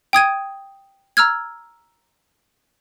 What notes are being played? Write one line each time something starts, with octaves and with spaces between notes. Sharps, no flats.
G5 D#6 G#6 D#7
A#5 E6 F6 G#6